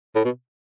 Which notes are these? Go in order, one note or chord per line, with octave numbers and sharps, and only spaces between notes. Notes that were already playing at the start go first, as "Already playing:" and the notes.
A2
B2